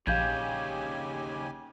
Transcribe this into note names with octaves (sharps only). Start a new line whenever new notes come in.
A#1 D#2 C#3 G4 F5 G#5 G6 G#6